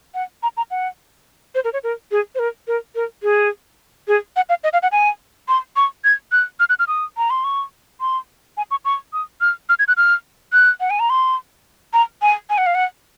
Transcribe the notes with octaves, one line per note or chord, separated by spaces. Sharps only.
F#5
A#5
A#5
F#5
C5
A#4
C#5
A#4
G#4
C5
A#4
A#4
A#4
G#4
G#4
F#5
F5
D#5
F5
F#5
G#5
C6
C#6
G#6
F#6
F6
F#6
F6
D#6
A#5
C6
C#6
C6
G#5
C#6
C#6
D#6
F6
F6
G#6
F#6
F6
F#6
F#5
G#5
A#5
C6
A#5
G#5
G#5
F#5
F5
F#5